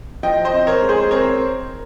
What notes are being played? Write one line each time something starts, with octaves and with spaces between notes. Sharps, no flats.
F3 D#5 G5
C5 D#5
C4
A#4 C#5
G#3
G#4 C5
C4 A#4 C#5